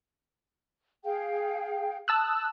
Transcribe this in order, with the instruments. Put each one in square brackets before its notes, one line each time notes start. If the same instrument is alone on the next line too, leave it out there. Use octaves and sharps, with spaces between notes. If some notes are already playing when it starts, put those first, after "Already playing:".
[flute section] G#4 F5 G5
[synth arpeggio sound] A5 E6 F#6 [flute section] D#6